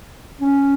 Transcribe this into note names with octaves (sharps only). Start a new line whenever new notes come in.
C#4